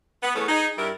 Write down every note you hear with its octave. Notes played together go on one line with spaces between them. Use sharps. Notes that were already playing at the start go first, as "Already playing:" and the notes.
B3
E3 A3 B3 C#4 G#4 B4
D#4 G#4
G2 G3 E4 A#4